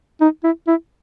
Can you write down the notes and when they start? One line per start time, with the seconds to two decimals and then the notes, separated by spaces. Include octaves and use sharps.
0.21 D#4
0.44 E4
0.67 E4